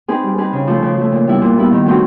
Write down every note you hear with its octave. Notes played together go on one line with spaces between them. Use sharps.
C4 D#4 G#4 B4
G3
C4 D#4 G#4 B4
C#3
F3 A3
C#3
F3 A3
A#2
G3 B3 E4
A#2
G3 B3 E4
D#3
F#3 A3 C4 D#4